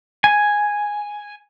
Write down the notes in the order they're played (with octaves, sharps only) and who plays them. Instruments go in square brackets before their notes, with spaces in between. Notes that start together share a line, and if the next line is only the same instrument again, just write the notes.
[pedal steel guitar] G#5